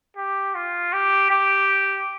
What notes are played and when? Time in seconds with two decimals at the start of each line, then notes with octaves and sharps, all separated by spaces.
0.16 G4
0.55 F4
0.93 G4
1.30 G4